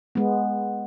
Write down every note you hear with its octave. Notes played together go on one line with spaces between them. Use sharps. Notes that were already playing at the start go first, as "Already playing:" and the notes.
G#3 B3